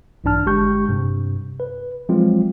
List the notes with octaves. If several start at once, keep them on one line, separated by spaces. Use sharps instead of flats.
A#1 G2 E3 D4 A5 F6
G1 G#3 G4 C#6 G6
G2 C3
B4
F3 F#3 G#3 C4 F4